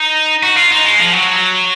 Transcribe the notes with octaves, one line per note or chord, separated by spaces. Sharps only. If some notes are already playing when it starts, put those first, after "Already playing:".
Already playing: D#4
F#4
F4
D#4
G#3
F3
F#3